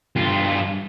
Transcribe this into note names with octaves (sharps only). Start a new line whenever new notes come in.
G2 F4